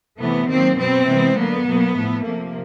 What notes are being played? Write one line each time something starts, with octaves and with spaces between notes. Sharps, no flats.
C3 E3 A3 B3
D#3 F#3 A#3 C4
B2 F#3 B3 C4
C3 E3 G#3 B3
D3 F#3 A#3 B3
B2 F#3 A#3
A2 F3 A3
C3 F3 A#3